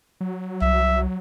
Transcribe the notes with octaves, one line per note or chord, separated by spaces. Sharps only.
F#3
C2 E5